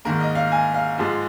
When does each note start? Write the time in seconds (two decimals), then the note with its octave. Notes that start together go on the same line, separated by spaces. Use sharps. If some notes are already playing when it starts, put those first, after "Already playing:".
0.05 G#2 D#3 A#3 A#4
0.21 D#5
0.35 F5
0.52 G#5
0.74 F5
0.98 G#2 F3 G#3